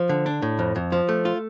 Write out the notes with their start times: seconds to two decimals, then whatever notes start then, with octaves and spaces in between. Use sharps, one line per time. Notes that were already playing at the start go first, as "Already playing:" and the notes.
Already playing: F3
0.09 D3
0.26 D4
0.42 A2
0.59 F2
0.76 F2
0.92 F3
1.09 A3
1.25 F4